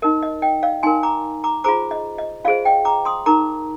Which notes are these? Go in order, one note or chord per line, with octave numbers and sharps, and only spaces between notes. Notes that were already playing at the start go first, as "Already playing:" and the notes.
D#4 A#4 D#5
D#5
D#5 G5
D5 F5
D#4 A#4 G#5 C6
A#5 D6
A#5 D6
F4 G#4 C5 A#5 D6
D#5
D#5
F4 G#4 C5 D5 F5
D#5 G5
A#5 D6
C6 D#6
D#4 A#4 A#5 D6